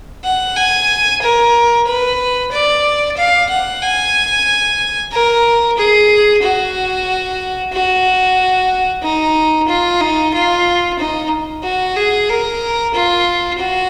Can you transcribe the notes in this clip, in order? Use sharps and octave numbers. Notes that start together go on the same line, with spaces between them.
F#5
G#5
A#4
B4
D5
F5
F#5
G#5
A#4
G#4
F#4
F#4
D#4
F4
D#4
F4
D#4
F#4
G#4
A#4
F4
F#4